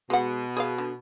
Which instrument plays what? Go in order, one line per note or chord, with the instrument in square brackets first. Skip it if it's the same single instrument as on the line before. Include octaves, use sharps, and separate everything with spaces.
[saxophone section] B2 [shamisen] G#3 F#5
[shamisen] G#4 D#5 F5
D3